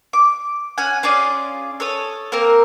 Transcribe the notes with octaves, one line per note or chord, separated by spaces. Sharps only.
D6
C#4 F#5 G#5
C#4 F4 G#4 D5
A4 C#5 D#6
A#3 C4 A#4